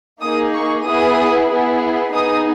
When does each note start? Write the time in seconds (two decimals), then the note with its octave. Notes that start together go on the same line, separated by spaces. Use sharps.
0.22 A#3 D#4 G#4 D#6
0.54 C#6
0.86 B3 E4 G#4 D#6
1.50 B3 E4 G#4
2.14 B3 D#4 G#4 D#6